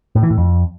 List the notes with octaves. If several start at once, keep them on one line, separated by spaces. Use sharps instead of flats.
A2
E3
A2
F2